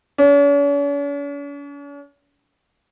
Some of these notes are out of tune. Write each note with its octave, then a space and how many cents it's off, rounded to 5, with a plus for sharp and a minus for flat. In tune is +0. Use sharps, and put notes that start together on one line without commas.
C#4 +45